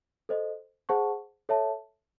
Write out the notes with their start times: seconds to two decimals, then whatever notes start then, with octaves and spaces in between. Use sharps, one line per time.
0.29 A4 C5 D#5
0.89 G#4 C5 F#5 A5 C#6
1.49 A4 C#5 E5 A5